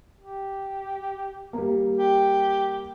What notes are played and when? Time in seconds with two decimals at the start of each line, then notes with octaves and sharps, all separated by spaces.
0.17 G4
1.53 G3 A#3
1.98 G4